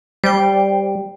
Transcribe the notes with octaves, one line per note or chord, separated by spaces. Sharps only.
G3 C5 D5 G5